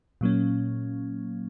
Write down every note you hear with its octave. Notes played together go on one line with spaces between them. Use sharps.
A#2 F#3 A#3 C#4